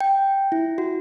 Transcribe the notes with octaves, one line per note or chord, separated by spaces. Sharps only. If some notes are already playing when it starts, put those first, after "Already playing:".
G5
E4
F#4